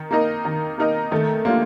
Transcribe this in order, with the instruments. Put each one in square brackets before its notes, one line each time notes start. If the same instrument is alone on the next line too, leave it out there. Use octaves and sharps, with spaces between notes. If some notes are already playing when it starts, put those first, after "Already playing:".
Already playing: [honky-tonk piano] D#3
A#3 D#4 A#4 D#5
D#3
A#3 D#4 A#4 D#5
[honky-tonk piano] D#3 [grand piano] A3
[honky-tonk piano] G3 D4 F4 [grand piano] A#3